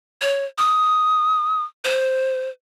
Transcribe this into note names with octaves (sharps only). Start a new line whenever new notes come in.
C#5
D#6
C5